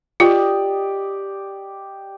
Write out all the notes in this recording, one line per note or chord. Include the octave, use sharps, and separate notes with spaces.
F4 G4 D5 D#5